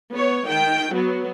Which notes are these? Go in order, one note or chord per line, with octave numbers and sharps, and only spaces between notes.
B3 C#5
D#3 G5
F#3 B3